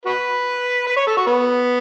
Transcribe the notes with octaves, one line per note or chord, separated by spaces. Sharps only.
F#4 B4
B4
C#5
A4
F#4
B3